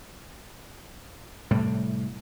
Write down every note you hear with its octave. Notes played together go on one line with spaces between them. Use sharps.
A2 C3 G3